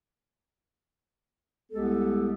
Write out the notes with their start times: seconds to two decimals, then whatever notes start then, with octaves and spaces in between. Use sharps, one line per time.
1.72 C2 G#3 B3 G4 A4